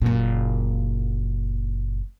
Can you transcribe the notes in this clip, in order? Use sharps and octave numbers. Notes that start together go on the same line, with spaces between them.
F#1 A#2